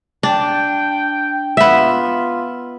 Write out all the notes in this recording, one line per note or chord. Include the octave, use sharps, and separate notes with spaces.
D4 G5
B3 F4 E5